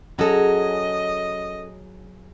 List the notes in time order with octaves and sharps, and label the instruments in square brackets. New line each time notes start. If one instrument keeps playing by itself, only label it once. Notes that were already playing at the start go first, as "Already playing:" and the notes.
[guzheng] F#3 G#4 [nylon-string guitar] C#4 A4 [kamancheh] D#5